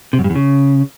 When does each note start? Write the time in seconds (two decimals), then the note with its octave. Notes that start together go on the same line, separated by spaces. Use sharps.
0.13 C3
0.19 F#2
0.24 G2
0.30 E2
0.36 C#3